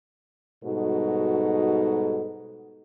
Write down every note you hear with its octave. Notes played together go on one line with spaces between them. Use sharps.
G#2 B2 G3 D#4 F#4 A4